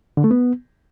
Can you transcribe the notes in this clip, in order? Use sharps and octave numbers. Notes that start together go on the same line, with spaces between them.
D3
A3
B3